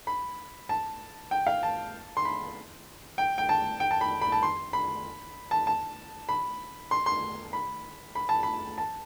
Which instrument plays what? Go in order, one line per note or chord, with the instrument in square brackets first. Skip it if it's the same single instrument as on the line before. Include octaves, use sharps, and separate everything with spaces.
[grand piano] B5
A5
G5
F5
A5
C6
B5
G5
G5
A5
G5
A5
B5
B5
A5
C6
B5
A5
A5
B5
C6
C6
B5
B5
A5
B5
A5